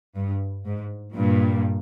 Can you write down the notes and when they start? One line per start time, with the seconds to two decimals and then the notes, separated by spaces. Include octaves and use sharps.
0.15 G2
0.65 G#2
1.15 G2 A#2